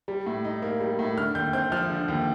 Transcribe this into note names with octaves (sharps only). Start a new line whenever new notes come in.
G3
A2
D#4
A#3
G3
A2
D3 F6
D#2 G6
C4 G6
F3 F6
D3
D#2